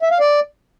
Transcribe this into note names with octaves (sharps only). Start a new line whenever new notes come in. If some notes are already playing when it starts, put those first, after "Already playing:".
E5
F5
D5